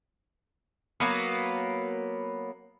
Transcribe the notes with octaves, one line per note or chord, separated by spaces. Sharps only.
F#3 A#3 B3